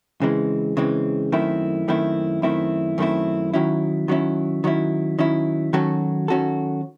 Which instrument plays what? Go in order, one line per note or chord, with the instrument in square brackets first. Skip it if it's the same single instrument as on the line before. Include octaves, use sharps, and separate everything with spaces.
[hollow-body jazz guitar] C#3 E3 G#3 C4
C#3 E3 G#3 C4
F#2 D#3 A3 C4 E4
F#2 D#3 A3 C4 E4
F#2 D#3 A3 C4 E4
F#2 D#3 A3 C4 E4
D#3 F#3 C#4 E4
D#3 F#3 C#4 E4
D#3 F#3 C#4 E4
D#3 F#3 C#4 E4
D#3 F#3 C#4 F#4 A4
D#3 F#3 C#4 F#4 A4